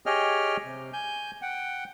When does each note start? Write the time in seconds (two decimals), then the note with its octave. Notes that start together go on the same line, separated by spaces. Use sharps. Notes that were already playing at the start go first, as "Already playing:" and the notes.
0.06 G4 G#4 C#5 D#5 G5 F6
0.65 C3
0.93 G#5 G6
1.42 F#5 G5